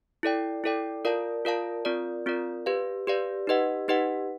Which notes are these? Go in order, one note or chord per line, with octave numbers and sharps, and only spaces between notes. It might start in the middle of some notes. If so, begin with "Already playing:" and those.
E4 A4 D5 G5
E4 A4 D5 G5
F4 A#4 D5 F5 A5
F4 A#4 D5 F5 A5
C4 F4 A#4 D5
C4 F4 A#4 D5
G4 B4 D5 F5
G4 B4 D5 F5
D#4 G4 B4 D#5 F#5
D#4 G4 B4 D#5 F#5